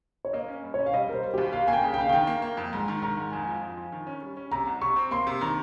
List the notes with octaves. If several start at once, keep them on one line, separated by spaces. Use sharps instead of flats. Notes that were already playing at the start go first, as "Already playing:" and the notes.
C#5
A#3 D#5
C#4
G2
C#4 C#5
F5
G3 D#5
G3 A#4
C5
G3
D#2 G4
A#3 F5
A#3 G#5
G5
C#3
G5
C#3 F5
D#3 G5
A#3
A#3
F2
G#2 A#5
D#3
D#3 A#5
G#2
F2 G#5
F3
F2
F3
D#3
C#4
G3
C#4
C3 A#5
C2
C3 C#6
C4
A#3 C6
C3
D#3 A#5